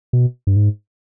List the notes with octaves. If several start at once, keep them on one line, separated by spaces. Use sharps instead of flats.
B2
G2
G#2